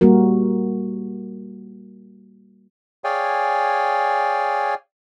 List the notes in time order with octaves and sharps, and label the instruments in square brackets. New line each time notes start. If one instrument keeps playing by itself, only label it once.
[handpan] G3 A#3 F#4 A#4
[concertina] G#4 C#5 D5 F5 G5 G#5